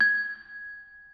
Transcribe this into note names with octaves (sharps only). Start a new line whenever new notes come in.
G#6